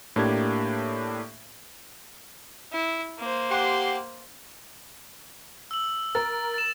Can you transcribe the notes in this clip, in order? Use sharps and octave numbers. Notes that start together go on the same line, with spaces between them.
A2 A#3 D4 G4 G#6
E4
A#3 C5
G4 F#5 C6
E6 F#7
A#4 A6
A6 E7